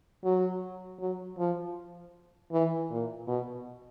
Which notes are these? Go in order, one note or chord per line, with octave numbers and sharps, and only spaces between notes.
F#3
F#3
F3
E3
A#2
B2